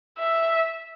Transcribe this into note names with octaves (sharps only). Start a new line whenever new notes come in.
E5